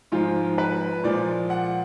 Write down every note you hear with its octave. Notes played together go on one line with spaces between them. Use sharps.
G#2 F3 G#3 F4
B4
A#2 F3 G#3 D5
F#5